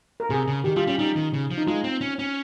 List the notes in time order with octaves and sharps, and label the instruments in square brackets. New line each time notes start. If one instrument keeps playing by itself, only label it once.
[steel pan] A#4
[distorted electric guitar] C3 [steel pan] G#4
[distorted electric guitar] C#3
[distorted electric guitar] D#3 [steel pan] G4
[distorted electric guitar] G3 [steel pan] F4
[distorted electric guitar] G3 [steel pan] C#4
[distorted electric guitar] G3 [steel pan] D#4
[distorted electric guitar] D#3
C#3
F3
[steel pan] D#4
[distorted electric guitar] G#3 [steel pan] F4
[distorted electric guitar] C4
C#4
C#4